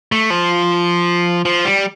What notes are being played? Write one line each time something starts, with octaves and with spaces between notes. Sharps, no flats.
A3
F3
F3
G3